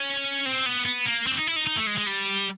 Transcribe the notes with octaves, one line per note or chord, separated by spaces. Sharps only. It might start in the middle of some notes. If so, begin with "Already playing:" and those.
Already playing: C#4
C4
B3
B3
A#3
C4 D4
D#4
E4
D#4
D#4
A3
G#3
G#3
G3